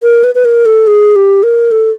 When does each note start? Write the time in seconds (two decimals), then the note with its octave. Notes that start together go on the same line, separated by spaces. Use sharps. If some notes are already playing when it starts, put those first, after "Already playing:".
0.03 A#4
0.24 B4
0.35 B4
0.45 A#4
0.66 A4
0.87 G#4
1.16 G4
1.43 A#4
1.71 A4